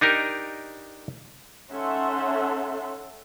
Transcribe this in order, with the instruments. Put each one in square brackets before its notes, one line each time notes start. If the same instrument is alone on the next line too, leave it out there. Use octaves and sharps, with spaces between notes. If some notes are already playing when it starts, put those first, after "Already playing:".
[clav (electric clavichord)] D4 D#4 G4 A#4
[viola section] C#4 D#4 A4 E5 F#5 C6